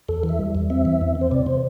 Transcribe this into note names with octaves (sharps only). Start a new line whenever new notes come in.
E2 A4
E3
E5
G3
E2
C4 E5
E3
E2
C4
C5
C3 D5
C3 C5